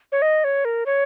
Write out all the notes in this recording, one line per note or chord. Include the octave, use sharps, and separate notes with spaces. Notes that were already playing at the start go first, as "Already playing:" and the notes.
C#5
D#5
C#5
A#4
C#5